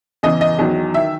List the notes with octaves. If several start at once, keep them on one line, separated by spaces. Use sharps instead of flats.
E2 C#3 E3 D#5
D#5
E2 D#3 F#3
D#3 E5